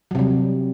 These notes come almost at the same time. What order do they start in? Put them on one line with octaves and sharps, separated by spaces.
F#3 C3 G3